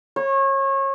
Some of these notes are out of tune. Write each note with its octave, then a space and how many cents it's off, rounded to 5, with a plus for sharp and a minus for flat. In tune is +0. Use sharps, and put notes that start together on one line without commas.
C#5 -30